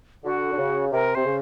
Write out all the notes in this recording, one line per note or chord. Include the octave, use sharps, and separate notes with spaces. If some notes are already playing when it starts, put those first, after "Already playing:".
D3 F#4
D3
C#3
C3 A#4
C3 C5
C#3